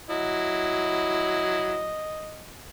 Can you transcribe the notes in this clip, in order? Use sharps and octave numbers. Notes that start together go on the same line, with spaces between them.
F#3 E4 D#5